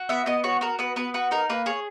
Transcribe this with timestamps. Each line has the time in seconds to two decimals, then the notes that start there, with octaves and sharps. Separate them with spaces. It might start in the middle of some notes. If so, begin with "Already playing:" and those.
Already playing: F#4
0.09 B3 E5
0.26 B3 D#5
0.44 F#4 C#5
0.61 F#4 A#4
0.79 B3 B4
0.96 B3 B4
1.14 F#4 B4
1.31 D#4 A#4
1.50 A#3 B4
1.66 G#4 C#5